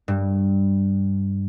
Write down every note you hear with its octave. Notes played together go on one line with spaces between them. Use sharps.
G2